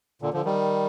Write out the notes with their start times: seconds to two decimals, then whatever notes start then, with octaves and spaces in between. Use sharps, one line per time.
0.22 A#2 D3
0.33 D3 F3
0.45 D#3 G3